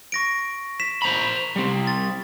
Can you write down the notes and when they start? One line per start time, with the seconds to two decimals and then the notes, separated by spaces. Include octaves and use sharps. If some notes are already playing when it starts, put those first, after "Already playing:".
0.12 C#6 A#6 D7
0.80 B6 E7
1.02 C5 A#5 B5
1.56 G3 C4
1.87 A6